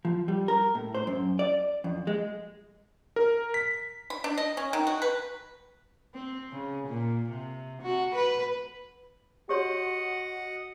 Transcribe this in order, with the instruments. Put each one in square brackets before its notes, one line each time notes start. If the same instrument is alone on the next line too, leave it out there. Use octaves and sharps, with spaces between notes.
[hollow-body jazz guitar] F3
G3
A#4
A2
C5
F#2
D5
F2
G#3
[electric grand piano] A#4
B6
[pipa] B5
D4
D#5
C#4
D#3
F#4
B4
[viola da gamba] C4
C#3
A#2
C3
F#4
B4
[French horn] F#4 [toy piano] G4 C#5 C6 [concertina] D#5 F#5